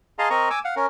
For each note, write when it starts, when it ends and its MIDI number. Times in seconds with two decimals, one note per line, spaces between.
0.19 0.29 68
0.19 0.29 75
0.19 0.29 77
0.19 0.29 81
0.19 0.29 82
0.19 0.29 84
0.30 0.49 60
0.30 0.49 70
0.30 0.49 75
0.30 0.49 82
0.30 0.49 85
0.50 0.59 80
0.50 0.59 86
0.50 0.59 88
0.65 0.75 77
0.65 0.75 78
0.76 0.86 61
0.76 0.86 70